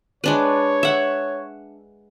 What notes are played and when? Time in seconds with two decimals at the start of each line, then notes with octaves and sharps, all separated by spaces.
0.24 G#3 D4 B4 C#5
0.83 E5 F#5